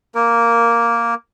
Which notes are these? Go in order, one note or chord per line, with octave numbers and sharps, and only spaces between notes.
A#3 A#4